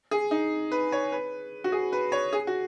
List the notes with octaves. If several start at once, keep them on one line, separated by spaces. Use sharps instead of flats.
G#4
D#4
B4
C#5
B4
F#4
G#4
B4
C#5
G#4
F#4